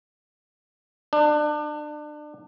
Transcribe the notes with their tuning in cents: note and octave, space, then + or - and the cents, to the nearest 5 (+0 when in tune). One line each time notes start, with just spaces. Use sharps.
D4 +30